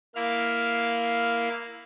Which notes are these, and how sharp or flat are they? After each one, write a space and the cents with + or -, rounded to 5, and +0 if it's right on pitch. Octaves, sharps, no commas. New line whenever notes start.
A#3 +0 E4 +10 F5 +0